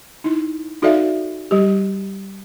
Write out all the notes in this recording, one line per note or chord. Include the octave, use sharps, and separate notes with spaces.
D#4 E4
D#4 F#4 A4 D5 E5 F5
G3 G4